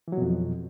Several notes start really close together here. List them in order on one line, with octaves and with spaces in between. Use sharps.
E3 F#3 B2 F2